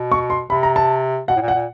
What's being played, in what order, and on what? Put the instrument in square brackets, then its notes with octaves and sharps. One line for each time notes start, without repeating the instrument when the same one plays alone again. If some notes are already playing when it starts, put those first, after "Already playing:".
Already playing: [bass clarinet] B2
[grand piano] C#6
C6
[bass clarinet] C3 [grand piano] B5
[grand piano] A#5
A5
[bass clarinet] B2 [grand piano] F#5
[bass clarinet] A2
A#2
[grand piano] F#5
[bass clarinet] A#2